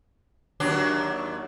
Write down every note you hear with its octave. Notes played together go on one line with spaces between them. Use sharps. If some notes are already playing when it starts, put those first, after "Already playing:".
D#2 F#3 D4